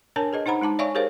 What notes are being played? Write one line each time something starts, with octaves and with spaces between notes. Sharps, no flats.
D4 A#4 C#5 G#5 A5
G#4 B4 D#5
D#4 C5 F#5 A#5 B5
G#3 D#4 A5 D6
C#5 D5 E5 F5 G#5 C#6
G4 G#4 A#4 C5 C#5 F5